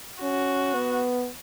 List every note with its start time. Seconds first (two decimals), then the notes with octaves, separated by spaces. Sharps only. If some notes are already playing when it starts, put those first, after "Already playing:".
0.22 C#4 F#4
0.74 B3